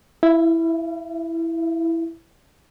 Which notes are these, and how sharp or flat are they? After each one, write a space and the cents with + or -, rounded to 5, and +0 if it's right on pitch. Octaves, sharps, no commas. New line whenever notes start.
E4 +0 F5 -45